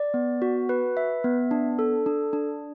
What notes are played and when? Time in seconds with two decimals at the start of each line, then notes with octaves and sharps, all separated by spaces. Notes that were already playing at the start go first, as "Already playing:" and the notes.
Already playing: D5
0.14 B3
0.42 F#4
0.69 B4
0.97 E5
1.24 B3
1.51 D4
1.79 A4
2.06 D4
2.33 D4